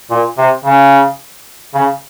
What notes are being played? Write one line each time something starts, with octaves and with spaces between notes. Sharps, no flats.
A#2
C3
C#3
C#3